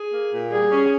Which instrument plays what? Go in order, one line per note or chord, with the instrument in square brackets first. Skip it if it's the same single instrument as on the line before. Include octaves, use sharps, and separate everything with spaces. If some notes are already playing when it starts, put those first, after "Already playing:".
Already playing: [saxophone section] G#4
A#3
A#2
[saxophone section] G3 [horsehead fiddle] G#4
[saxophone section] C#4